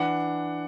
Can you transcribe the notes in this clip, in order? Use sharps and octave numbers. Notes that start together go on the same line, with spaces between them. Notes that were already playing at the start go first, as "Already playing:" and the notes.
Already playing: E3 D4 F#5